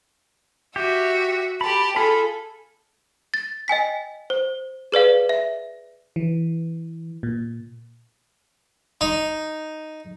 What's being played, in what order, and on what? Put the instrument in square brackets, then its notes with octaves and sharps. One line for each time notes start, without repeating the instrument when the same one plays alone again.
[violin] F#4 E5 [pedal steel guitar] G4
[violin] G4 A5 [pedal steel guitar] B5
[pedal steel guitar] F4 B5 [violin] G#4 A4
[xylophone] A6
D#5 G5 G#5 B6
C5
G#4 B4 D5 F5
E5
[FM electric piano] E3
A#2
[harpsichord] D#4